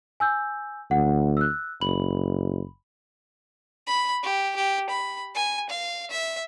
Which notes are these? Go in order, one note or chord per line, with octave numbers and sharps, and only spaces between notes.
G#5 E6 G6
D2 F#5
E6 F#6
F#1 B5 F#7
B5
G4
G4
B5
G#5
F5
E5